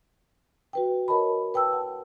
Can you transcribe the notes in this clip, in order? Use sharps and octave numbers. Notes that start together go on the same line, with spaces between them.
F#4 B4 G5
A#4 C#5 D#5 A5 B5
B4 G5 A5 E6
F#5 A5